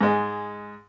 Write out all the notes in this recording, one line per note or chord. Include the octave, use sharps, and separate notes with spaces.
G#2 G#3